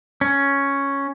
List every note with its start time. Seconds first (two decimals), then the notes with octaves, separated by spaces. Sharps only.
0.21 C#4